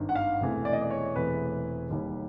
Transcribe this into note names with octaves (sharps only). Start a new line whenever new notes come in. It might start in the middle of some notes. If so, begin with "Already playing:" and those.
Already playing: G#1 G2 D#3
F#5
F5
E1 E2 C3 E3 A3
D5
D#5
D5
C#5
E1 E2 C3 E3 A3 B4
E1 D#2 D#3 G3